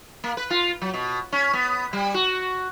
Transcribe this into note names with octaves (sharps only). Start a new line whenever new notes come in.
A#3
B4
F4
F#3
B2
C#4
B3
G3
F#4